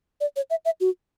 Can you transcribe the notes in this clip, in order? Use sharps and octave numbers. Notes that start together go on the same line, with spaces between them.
D5
C#5
E5
E5
F#4